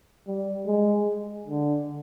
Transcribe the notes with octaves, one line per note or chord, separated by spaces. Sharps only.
G3
G#3
D3